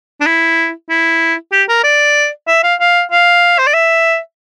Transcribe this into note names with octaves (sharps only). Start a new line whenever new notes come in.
D4
E4
E4
G4
A#4
D5
E5
F5
F5
F5
C5
D5
E5